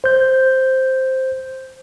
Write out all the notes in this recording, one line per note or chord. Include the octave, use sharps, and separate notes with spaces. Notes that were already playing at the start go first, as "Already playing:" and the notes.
C5 G6